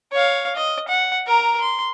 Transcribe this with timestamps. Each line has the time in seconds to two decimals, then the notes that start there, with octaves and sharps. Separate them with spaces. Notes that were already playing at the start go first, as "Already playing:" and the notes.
0.12 C#5 F5
0.56 D#5
0.88 F#5
1.26 A#4 A#5
1.60 C6